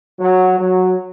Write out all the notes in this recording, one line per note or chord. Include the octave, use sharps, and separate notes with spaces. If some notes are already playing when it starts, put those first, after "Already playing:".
F#3
F#3